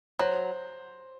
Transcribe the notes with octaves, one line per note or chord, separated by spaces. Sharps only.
F#3 C5